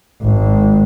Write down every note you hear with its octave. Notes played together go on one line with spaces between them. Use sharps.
G#1